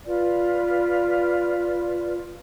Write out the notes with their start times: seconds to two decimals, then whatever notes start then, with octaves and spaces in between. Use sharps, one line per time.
0.05 F4 B4 D5